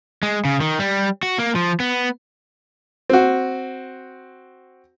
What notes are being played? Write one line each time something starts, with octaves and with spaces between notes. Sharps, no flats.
G#3
C#3
D#3
G3
F#4
A#3
F3
B3
C4 F#4